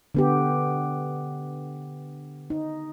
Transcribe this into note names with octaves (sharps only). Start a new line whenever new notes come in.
D3 B3 G4
D#4